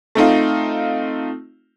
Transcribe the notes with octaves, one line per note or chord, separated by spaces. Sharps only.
A3 C4 D#4 F4